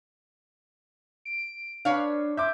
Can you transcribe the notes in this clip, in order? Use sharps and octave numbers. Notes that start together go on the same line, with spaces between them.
D7
D4 B4 C#5 F5
E5 D6 G6